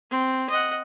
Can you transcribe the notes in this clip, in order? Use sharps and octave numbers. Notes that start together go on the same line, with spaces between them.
C4
D#5 F#5